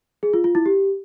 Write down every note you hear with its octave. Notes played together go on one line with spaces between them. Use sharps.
G#4
F4
F4
E4
G4